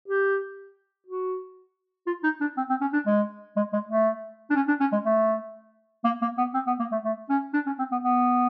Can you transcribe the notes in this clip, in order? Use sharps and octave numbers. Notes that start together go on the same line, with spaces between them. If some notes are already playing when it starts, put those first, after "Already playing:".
G4
F#4
F4
D#4
D4
C4
C4
C#4
D4
G#3
G#3
G#3
A3
D4
C#4
D4
C#4
G#3
A3
A#3
A#3
B3
C4
B3
A#3
A3
A3
C#4
D4
C#4
C4
B3
B3